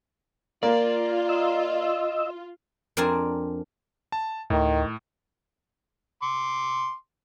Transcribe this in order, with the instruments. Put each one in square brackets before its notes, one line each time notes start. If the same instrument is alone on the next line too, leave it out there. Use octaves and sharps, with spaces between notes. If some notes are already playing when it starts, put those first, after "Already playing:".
[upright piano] A#3 [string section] F4 [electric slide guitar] D5
[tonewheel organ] D#5 E6
[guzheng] F2 C4 D4 A#4 D5 G#5
[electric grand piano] A5
[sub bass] D2 [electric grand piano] A2 [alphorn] D#3
[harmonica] C6 D6